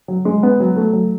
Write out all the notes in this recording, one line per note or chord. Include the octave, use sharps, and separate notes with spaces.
F#3
G#3
B3
F#3
A3
F#3